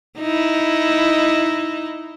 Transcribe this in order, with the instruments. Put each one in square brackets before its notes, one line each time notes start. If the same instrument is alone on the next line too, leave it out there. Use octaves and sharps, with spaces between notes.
[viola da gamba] D#4 E4